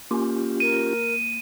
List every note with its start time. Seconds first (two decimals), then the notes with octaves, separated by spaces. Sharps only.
0.11 A#3 C#4 F4 G4
0.60 A#4 D#7